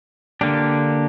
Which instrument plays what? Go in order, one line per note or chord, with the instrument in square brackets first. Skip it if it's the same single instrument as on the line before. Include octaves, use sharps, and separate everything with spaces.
[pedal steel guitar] D3 A#3 D4 G4